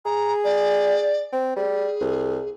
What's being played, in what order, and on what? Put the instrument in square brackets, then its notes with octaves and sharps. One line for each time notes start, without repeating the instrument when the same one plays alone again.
[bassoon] G#4 [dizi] A#5
[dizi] D5
[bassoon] C4
[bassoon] G3 [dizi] G#4
[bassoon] C2